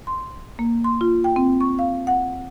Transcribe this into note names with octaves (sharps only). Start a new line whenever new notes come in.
C6
A#3
C6
F4
G5
C4
C#6
F5
F#5